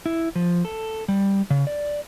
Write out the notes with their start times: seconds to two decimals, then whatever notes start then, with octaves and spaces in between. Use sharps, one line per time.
0.06 E4
0.35 F3
0.65 A4
1.08 G3
1.50 C#3
1.67 D5